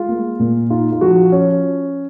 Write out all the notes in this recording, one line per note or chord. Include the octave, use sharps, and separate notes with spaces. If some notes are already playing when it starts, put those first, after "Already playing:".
Already playing: G#3 F4
A#3
A#2
D#4 F4
F4
F3 F#4
C#4